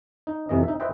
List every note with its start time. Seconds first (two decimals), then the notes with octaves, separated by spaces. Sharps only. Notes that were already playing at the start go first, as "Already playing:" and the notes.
0.27 D#4
0.49 F2 C3 E3 D#5
0.64 D#4 E5
0.80 B4 C5 D#5 E5 G5